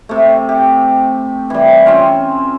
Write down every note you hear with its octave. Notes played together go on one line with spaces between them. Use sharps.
C3 A3
G4
E3 G3
C4 C#4 F4